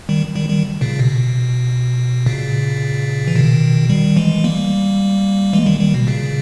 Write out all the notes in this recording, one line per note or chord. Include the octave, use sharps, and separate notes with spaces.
D#3 G3
D#3 G3
D#3 G3
A#2 C#3
B2
A#2 C#3
E3
B2 D#3
D#3 G3
E3 G#3
G3 A#3
E3 G#3
D#3 G3
D#3 G3
B2
A#2 C#3